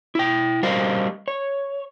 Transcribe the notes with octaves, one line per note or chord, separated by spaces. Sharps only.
E4 G5
G3 A#4 C5 D#5 F5
C#5